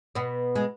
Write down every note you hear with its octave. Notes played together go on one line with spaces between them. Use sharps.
B2 B3
G#3